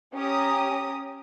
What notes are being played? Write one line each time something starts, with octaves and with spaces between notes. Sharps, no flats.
C#4 G4 C#5 A#5 D#6